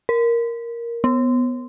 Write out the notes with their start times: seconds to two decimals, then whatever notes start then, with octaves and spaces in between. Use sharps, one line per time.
0.09 A#4
1.04 B3